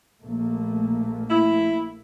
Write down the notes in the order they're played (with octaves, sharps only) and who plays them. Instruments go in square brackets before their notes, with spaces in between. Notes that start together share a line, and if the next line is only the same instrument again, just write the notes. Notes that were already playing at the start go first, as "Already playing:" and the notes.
[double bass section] A#1 A3 A#3
[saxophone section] E4